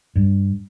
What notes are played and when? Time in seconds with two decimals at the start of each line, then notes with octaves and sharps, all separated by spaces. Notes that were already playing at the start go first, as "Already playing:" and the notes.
0.15 G2